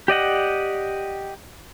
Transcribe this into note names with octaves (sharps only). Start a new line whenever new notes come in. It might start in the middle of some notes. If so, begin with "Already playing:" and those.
G4 D5 D#5 F#5